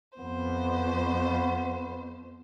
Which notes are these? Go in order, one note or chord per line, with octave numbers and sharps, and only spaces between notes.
F2 B3 C5